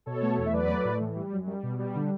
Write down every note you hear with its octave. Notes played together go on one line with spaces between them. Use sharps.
B2 A4 C#5
A3
E2
E5
F#3 B4 D5
A3
A2
E3
G3
F#2
G3
B2
G3
D3